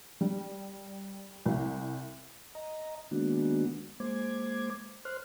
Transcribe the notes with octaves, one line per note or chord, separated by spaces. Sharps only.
G3
C2
D#5 A#5
D#3 G#3 A#3 B3 D4 F#4
G#3 A#3 C5 D6 G#6
C5 C6 F6 F#6